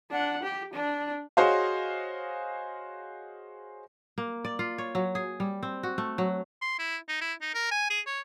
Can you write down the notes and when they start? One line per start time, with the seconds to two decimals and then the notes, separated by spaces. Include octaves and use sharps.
0.11 D4 F#5
0.43 G4
0.73 D4
1.37 F#4 G#4 C5 C#5 D#5 F5
4.18 A#3
4.45 D5
4.59 F4
4.78 C#5
4.95 F#3
5.15 G#4
5.40 G3
5.63 C4
5.83 F#4
5.98 A3
6.18 F#3
6.61 C6
6.79 E4
7.08 D#4
7.21 E4
7.41 D#4
7.54 A#4
7.71 G#5
7.90 G#4
8.06 C#5